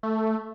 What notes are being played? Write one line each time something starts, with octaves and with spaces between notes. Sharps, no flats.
A3